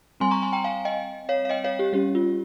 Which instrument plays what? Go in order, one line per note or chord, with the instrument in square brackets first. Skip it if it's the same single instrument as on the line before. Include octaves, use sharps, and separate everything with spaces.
[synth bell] G3 C4 G#5 C6
A#5 C#6
G#5 C6
G5 A#5
F5 G#5
D#5 G5
C#5 F5
F5
D#5 G5
C#5 F5
G4
G3 C#4 G4
F4